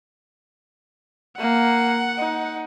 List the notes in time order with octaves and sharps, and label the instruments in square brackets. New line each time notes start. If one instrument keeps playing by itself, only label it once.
[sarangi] A#3 [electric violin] F#5
[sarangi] D#4